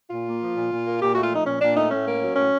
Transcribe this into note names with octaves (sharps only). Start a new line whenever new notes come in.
A#2 F4
A#3
F3
A#2
A#2
A#3
A#2 G4
A3 F#4
F4
F3 D#4
A#2 C#4
A#2 D4
A3 D#4
A2 C#4
A#3
F#3
A2 C#4